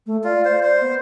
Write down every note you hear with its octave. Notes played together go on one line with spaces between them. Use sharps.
A3
F4 D5
C5
C5
B3